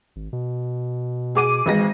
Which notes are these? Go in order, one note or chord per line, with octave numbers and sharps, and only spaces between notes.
G#1
B2
G#4 D6 D#7
G#1 E3 G#3 A#6